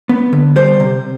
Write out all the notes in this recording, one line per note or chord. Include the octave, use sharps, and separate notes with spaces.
B3
D3
G3 C5
C3